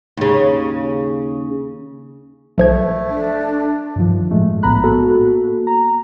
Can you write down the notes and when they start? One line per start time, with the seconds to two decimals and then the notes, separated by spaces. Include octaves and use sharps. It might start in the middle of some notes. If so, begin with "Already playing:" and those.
0.17 D#2 C#3
2.58 B1 F3 A3 G#6
3.10 D4
3.96 G2 D#3 F3
4.31 A2 G#3 A3
4.63 A#1 A2 B3 A#5 B5 F#6
4.83 A#3 B3 F#4 A4
5.67 A#5